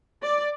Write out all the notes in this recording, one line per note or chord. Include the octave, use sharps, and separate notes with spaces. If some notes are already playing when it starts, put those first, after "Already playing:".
D5